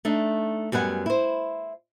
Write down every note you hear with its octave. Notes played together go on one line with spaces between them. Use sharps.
A3 D4 D#4
F#2 G3 B3 F#5 G#5
E4 C5